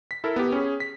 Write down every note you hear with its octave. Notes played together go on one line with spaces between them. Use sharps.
B6
E4 A4 A#4
B3 G4
C#4 G#4
B6